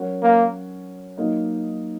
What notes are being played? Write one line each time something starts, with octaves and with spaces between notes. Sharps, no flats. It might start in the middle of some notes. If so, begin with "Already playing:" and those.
Already playing: F#3 C#4 F#4 A#4
A#3
F#3 A#3 D#4